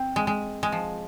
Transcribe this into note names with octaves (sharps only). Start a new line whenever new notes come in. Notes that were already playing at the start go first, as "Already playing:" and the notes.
Already playing: C4
G#3
G#3
G#3
F3